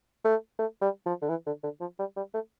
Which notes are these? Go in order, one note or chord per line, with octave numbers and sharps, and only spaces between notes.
A3
A3
G3
F3
D3
E3
D3
D3
F3
G3
G3
A3